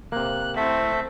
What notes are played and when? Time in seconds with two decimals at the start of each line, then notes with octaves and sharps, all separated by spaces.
0.12 C3 A#3 F#6
0.56 A3 C4 E4 A4 E5 F#5